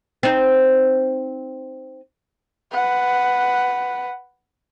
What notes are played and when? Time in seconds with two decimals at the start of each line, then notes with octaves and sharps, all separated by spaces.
0.23 C4 D#4
2.72 B4 F#5